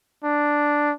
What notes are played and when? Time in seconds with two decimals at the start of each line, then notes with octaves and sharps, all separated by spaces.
0.24 D4